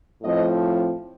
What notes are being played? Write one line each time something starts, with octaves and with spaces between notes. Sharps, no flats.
A2 F3 C4 D#5